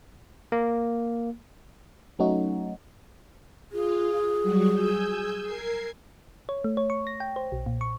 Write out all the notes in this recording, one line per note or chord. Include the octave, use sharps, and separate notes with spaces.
A#3
F#3 A3 C#4 D#4 F#4
F4 G#4
F#3 G3 F#4
G#5 E6 G6
A#4 G#6 C7
C#5
A3
C#5
C#6
A#6
G5
C5
B1
A#2
C#6